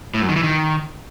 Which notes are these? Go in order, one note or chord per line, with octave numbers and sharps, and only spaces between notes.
A2
F#2
D#3
E3
D#3